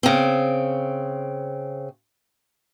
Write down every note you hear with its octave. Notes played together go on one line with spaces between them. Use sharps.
C#3 C4